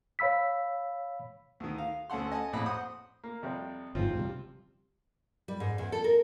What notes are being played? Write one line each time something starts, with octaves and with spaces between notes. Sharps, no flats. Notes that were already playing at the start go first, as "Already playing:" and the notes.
C#5 F5 B5 E6 B6
D2 D#3
F5
D2 C#4 A4 F#5 C6
D#5 G#5 A5
A#1 F2 A2 D#5 B5
C5 F#5 D#6
A#3
F2 C3 G3
G1 E2 G#2 F3 C4 F4
C3 F#3 G3
G3
G#2
E2
A4
A#4